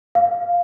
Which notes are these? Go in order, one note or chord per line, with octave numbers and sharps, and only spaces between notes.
F5